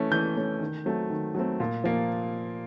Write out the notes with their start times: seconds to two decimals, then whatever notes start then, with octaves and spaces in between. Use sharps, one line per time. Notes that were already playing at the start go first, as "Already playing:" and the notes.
Already playing: E3 A3 C#4
0.11 E3 G6
0.36 A3 C#4
0.60 D#3
0.86 F#3 A3 C4
1.10 D#3
1.35 F#3 A3 C4
1.60 A#2
1.84 F3 A#3